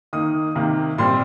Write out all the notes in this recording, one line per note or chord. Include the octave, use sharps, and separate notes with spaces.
D#3 A#3 D#4 D#6
C3 D#3 A#3
A#2 G3 C4 C6